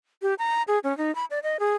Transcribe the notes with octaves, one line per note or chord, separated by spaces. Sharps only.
G4
A#5
G#4
C#4
D#4
B5
D5
D#5
G#4